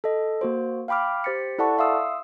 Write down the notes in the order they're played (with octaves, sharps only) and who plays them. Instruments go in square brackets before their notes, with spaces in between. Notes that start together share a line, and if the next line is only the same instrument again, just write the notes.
[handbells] A4 D#5
A#3 F#4 C5
F5 G5 B5 D6 F6
G4 C5 A6 B6 C#7
E4 A4 D5 F#5 A5 C#6
E5 F5 C6 D#6 E6